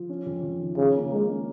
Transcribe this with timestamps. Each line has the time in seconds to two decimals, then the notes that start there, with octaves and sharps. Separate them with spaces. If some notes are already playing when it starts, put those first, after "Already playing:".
Already playing: F3
0.09 C#4
0.26 F2
0.43 F2
0.60 D#3
0.77 C#3 F3
0.95 A#3
1.11 G#3 A#3
1.29 C#4